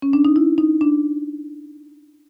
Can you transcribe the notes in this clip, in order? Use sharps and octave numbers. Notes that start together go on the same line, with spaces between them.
C#4
D4
D#4
E4
D#4
D4